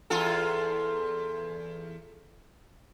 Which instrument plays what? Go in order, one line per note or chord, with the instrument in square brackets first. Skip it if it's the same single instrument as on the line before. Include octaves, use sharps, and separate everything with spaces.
[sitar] E2 F4 A4